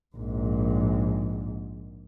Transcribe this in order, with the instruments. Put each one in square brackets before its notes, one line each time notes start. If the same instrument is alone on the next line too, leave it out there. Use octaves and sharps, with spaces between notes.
[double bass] A#1 G#2